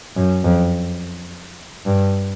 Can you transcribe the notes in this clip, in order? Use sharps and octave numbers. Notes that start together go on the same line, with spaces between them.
F#2
F2
G2